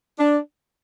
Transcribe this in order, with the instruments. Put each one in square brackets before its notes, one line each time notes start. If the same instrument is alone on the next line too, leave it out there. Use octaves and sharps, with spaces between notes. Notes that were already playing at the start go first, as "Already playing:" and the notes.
[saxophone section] D4